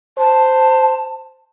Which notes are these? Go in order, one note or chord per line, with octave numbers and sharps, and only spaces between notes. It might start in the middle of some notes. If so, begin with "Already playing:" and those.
C5 A5